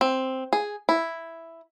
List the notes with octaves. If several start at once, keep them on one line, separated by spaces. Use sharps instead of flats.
C4
G#4
E4